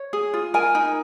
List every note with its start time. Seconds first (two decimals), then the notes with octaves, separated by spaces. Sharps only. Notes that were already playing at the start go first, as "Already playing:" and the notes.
Already playing: C#5
0.13 G#4
0.34 F4
0.54 A#4 G#5
0.75 D#4